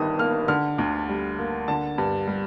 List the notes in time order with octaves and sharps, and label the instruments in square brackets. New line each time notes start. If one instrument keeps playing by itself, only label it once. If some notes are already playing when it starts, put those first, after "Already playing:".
Already playing: [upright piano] G1 G2 D#3 D#6
A#3 F6
D3 F6
D2
G3
A#3
D3 A5
G2
G3